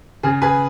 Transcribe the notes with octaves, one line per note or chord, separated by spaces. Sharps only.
C#3 G#4
G#4 B4